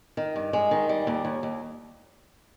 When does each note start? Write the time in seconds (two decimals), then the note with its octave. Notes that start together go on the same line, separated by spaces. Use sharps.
0.17 D#3
0.36 G2
0.53 G#3
0.71 D#3
0.89 G3
1.07 D#2
1.25 D#2
1.43 D#2